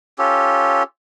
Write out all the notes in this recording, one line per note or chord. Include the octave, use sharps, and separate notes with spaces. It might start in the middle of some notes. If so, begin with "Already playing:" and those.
C#4 F4 G4 A4